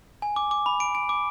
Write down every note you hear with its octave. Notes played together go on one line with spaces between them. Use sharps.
G#5
D6
D6
B5
D7
D7
D6